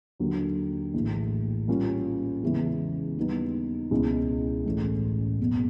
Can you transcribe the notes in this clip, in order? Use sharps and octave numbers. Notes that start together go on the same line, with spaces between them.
D#2 D3 F#3
A#1 A2 E3
A#2 G3 A#3 C#4 F4
E2 C#3 E3 G#3
D#2 D#3 G3 B3 D#4
C#2 B2 G#3 C#4 E4
A1 A2 E3 A3 C#4
F#1 E2 B2